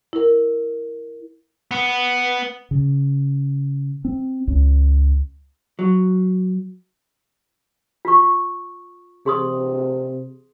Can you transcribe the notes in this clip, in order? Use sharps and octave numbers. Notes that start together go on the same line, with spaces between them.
E4 A#4
B3
C#3
C4
C#2
F#3
F4 C#6
C3 G#4 C6 D#6